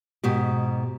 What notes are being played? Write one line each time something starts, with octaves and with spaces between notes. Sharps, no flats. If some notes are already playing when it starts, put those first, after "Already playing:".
G#2 B2 G4